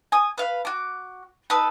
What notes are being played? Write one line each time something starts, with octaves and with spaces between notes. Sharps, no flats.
G#5 D#6
B4 F5
F#4 D6
D#4 A4 B4